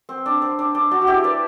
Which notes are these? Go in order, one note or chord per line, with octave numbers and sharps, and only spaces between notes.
C4
D4
C4
D4
D4
D4 F#4
F#4
E4 G4
B4 D5